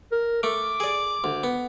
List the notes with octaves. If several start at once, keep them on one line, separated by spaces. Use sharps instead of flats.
A#4
A3 D6
G#4 D5
D2
B3